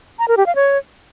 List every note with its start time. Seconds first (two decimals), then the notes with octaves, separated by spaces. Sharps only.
0.19 A#5
0.28 A#4
0.37 G4
0.46 F5
0.55 C#5